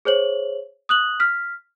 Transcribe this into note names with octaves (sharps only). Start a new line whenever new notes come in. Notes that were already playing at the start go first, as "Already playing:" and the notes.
G#4 C5 C#5 F#7
D#6 F#6 F#7
F6 B6